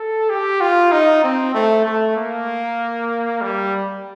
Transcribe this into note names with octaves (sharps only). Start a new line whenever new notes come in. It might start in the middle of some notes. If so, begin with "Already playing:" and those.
Already playing: A4
G4
F4
D#4
C4
A3
A3
A#3
G3